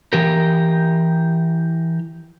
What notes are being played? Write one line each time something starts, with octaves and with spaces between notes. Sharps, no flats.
E3 G4 A#4